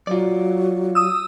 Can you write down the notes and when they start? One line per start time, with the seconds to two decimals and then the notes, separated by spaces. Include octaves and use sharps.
0.07 F#3 F4 D5
0.95 D#6 E6